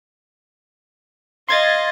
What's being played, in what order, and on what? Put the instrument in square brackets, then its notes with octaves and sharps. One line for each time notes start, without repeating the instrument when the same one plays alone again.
[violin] D#5 F5 [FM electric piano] C6 G#6 A6